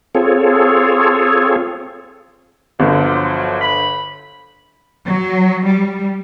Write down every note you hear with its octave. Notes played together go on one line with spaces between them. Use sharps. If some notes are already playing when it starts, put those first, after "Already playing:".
C4 F4 G#4 A4 C#5
G1 D3 F3 F#3
B5
F#3
G3